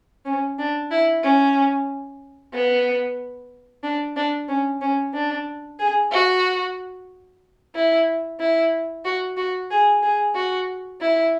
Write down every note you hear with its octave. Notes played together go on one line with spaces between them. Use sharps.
C#4
D4
E4
C#4
B3
D4
D4
C#4
C#4
D4
G#4
F#4
E4
E4
F#4
F#4
G#4
G#4
F#4
E4